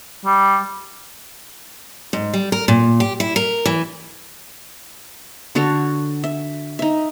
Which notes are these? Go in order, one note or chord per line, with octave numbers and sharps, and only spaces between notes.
G3
G#2
G3
A#4
A#2
G4
E4
A#4
E3
D3 F#4 A4 C#5
E5
D#4 E5